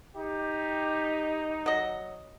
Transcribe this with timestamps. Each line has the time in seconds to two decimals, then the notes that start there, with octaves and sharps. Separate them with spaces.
0.17 D#4 G4
1.66 F#3 D#5